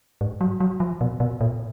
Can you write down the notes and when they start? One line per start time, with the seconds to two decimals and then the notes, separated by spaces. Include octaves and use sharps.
0.21 G#2
0.41 F#3
0.60 F#3
0.80 F3
1.01 B2
1.20 B2
1.41 A#2